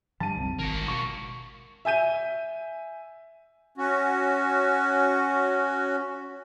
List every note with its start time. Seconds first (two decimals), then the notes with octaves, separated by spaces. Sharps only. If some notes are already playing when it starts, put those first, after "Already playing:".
0.20 G2 D3 F3 F#3 A5 D#7
0.36 E1 C2 C4
0.59 G#1 A#3 F#4
0.88 B2 C#6
1.85 E5 G#5 G6 D#7
3.78 C#4 F#4